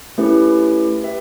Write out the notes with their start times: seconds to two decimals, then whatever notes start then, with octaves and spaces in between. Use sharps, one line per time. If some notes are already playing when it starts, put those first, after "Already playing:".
0.18 A3 C#4 E4 G4 B4
1.02 G4 B4 E5 G5